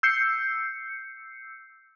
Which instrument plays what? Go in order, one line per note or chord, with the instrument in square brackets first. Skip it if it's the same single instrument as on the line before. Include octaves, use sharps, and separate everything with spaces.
[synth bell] E6 G6 C7 C#7